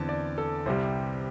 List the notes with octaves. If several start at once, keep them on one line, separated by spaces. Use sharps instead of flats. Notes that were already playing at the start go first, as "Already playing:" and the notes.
Already playing: E2 D3 C4 A5
D5
A4
C2 C3 G3 C5